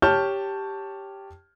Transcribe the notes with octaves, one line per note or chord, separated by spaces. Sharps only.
G4 C#5 A5 C#6 F6 G6